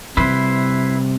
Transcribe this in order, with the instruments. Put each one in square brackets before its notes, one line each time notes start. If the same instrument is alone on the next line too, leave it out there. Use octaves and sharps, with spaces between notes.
[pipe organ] C3 [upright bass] G3 [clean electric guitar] E4 B4 C5